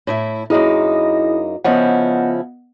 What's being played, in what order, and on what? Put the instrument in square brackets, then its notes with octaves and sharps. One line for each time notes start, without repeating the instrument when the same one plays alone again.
[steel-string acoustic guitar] A2 E4 E5
[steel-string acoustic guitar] F#2 A#3 D#4 [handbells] E4 G#4 D#5
[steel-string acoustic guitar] C#3 F3 E4 [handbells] B3 D#5 F#5